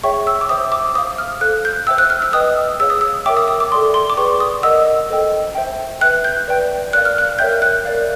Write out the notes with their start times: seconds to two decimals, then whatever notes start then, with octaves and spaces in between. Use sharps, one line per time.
0.04 G#4 C#5 E5 G5 C#6
0.27 E6
0.41 D6
0.49 C5 E5 G5 D#6
0.72 D6
0.95 C5 F5 D#6
1.18 F6
1.41 A4 C5 F5 F#6
1.65 G6
1.87 C5 E5 G5 E6
1.98 F#6
2.10 F6
2.22 E6
2.33 B4 D#5 G5 D#6
2.80 G#4 C#5 F5 E6
2.90 D#6
3.01 E6
3.26 A#4 C#5 E5 G5 D6
3.37 D#6
3.48 D#6
3.60 D6
3.71 A4 D5 G5 C6
3.94 C6
4.10 D6
4.17 G#4 B4 D5 G5 C#6
4.40 D#6
4.63 A#4 D#5 F#5 E6
5.10 A4 C5 D#5 G5
5.55 C5 E5 G5
6.01 B4 E5 G5 F#6
6.24 G6
6.48 B4 D5 G5
6.93 A#4 D5 F5 F#6
7.05 F6
7.18 F#6
7.39 A#4 C#5 E5 G5 G6
7.62 F#6
7.85 A#4 D5 F5